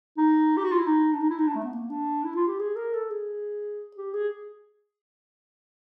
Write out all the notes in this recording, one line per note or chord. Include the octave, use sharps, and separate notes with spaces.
D#4
G4
F#4
F4
E4
D#4
D4
D#4
E4
D#4
D4
A3
B3
A#3
D4
E4
F4
G4
G#4
A#4
A4
G#4
G4
G#4